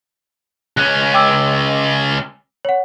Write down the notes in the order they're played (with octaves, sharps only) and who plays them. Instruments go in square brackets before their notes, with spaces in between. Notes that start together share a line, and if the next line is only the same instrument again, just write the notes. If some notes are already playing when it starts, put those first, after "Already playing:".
[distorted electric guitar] C#2 C#4 [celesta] F#6
[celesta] G5 D6 E6
C#5 F#5